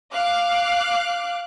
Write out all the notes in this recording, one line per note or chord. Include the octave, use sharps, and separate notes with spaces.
F5 D6 F#6